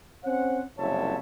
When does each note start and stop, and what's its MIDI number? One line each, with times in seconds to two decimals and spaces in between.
0.24 0.62 60
0.24 0.62 61
0.24 0.62 72
0.24 0.62 78
0.78 1.17 30
0.78 1.17 36
0.78 1.17 41
0.78 1.17 73
0.78 1.17 76
0.78 1.17 81